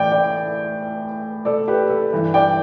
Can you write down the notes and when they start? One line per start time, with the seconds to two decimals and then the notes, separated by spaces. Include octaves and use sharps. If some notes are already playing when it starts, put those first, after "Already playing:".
Already playing: A2 E3 D5 G5
0.11 D5 G5
1.45 A4 D5
1.68 G4 B4
1.89 A4
2.13 G2 E3
2.34 D5 G5